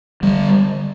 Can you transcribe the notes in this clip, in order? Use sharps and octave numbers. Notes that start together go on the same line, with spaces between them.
D3 G3